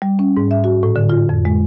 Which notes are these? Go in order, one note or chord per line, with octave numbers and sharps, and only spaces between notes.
G3
C#4
G#2
E5
F#4
A2
D3
F4
F2
G#3